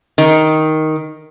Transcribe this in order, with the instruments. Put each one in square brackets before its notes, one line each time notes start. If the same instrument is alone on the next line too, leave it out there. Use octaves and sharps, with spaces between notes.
[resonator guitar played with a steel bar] D#3